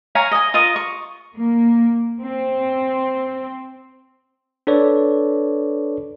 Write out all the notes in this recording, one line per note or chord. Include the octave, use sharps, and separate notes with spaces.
C#5 F5 G#5 A#5
D#5 G#5
F4 A#4 D#5 D#6
C#6
A#3
C4
D4 A4 B4 C#5 D5